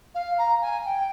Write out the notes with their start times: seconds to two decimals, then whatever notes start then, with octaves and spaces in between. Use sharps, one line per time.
0.14 F5
0.38 A#5
0.61 G#5
0.85 G5